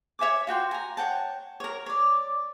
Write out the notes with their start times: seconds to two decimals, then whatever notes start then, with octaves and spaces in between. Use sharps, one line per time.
0.19 C#5 E5 G#5 D6
0.47 F4 F#4 G5 C6
0.71 G#5 A#5
0.97 C#5 F#5 G5 A5
1.60 A#4 C#5
1.86 C#5 D5